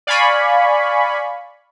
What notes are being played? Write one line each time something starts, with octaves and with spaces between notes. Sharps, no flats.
D5 F5 G#5 B5 C#6